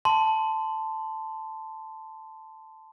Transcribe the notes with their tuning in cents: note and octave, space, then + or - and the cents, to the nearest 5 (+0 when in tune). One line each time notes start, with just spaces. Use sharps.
A5 +0 C6 -15